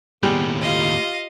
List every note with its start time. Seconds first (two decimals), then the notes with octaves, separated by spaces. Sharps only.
0.23 D#2 A2 G3 G#3 B3
0.61 F4 G4 D#5 F5